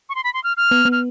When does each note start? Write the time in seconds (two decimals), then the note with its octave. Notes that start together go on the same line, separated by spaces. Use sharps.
0.09 C#6
0.15 C6
0.24 B5
0.34 C6
0.44 F6
0.57 F6
0.71 B3
0.85 B3
0.92 F6